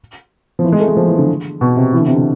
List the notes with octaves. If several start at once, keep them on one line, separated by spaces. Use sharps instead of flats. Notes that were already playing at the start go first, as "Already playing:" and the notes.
F3
E3
G#3
A3
G#3
F3
E3
D3
B2
C3
E3
D3
C3
D3